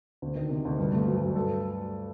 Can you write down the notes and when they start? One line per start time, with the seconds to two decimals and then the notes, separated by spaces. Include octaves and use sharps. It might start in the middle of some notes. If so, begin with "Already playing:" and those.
0.22 D2
0.35 D#3
0.50 C3
0.65 D2
0.78 G2
0.93 A3
1.07 F#3
1.22 G2
1.36 A4